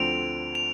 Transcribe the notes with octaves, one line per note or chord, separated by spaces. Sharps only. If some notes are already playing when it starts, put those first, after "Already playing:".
Already playing: D2 D3 F3 C4 D7 F7
F7